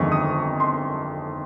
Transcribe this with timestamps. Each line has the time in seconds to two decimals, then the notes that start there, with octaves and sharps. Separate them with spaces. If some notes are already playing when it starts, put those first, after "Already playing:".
Already playing: G1 F2 D#3 G#3 C#6
0.12 D#6
0.60 C6